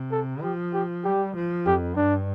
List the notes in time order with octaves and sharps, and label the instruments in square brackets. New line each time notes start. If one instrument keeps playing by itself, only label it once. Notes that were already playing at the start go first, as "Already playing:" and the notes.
Already playing: [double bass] C3
[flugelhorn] A4
[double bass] F3 [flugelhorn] G4
[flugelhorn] G4
[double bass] G3 [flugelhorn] G4
[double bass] F3
[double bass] F2 [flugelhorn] G4
[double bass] G2 [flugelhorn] D4